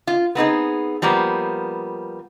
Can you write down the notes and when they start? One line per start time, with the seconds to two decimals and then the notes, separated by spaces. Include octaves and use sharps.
0.07 F4
0.35 B3 C4 D#4 G#4
1.02 F3 G3 A#3 B3 C5